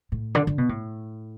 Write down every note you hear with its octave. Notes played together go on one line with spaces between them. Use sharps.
A2
D3
D3
B2
A2